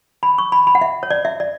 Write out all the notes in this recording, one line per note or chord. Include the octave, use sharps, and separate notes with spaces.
B5
C#6
B5
B5
F#5
E5
C#5
D5
E5
D5